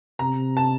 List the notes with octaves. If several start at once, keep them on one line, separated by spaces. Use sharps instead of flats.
C3 A#5
A5